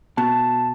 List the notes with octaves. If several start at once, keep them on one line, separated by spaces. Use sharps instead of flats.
B2 A5